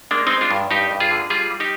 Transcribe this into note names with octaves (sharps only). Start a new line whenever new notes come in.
G#3 A#3 D4
G#3 C4 D#4
D4 F4
G2
G2 D#4 G4
G2
F4 G#4
D3
G3 F4 G#4
G3
D#4 G4